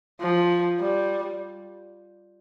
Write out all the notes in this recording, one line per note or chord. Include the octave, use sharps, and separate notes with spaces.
F3
G3